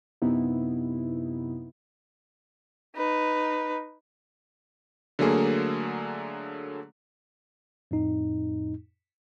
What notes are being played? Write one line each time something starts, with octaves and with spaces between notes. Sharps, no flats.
F#2 C3 B3 D#4 E4
D#4 B4
D3 F#3 A3 A#3 G#4
F2 A2 D#4